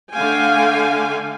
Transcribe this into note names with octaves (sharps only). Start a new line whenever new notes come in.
D3 A3 F5 G5 G#5